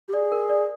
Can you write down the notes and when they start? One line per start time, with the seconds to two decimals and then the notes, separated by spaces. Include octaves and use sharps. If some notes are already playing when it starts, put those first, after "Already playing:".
0.08 G4
0.13 G#4 D5
0.32 A#4
0.49 D5